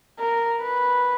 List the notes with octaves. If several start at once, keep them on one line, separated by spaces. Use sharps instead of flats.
A#4
B4